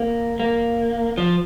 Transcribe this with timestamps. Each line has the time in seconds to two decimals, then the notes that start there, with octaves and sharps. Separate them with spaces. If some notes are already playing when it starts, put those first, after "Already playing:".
Already playing: A#3
0.40 A#3
1.18 F3